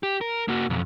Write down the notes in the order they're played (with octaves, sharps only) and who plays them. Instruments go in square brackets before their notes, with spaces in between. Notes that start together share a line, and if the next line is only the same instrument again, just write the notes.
[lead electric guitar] G4
A#4
A#3 F#4
B1 F2